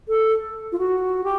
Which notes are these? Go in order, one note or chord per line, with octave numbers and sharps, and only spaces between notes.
A4
F4
F#4
G4